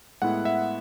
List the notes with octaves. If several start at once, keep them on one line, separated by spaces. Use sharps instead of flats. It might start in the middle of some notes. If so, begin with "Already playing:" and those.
A2 G#3 B3 E4 F#5
E5